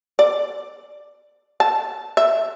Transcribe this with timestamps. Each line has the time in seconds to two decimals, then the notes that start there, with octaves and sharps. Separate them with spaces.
0.19 D5
1.60 A5
2.17 E5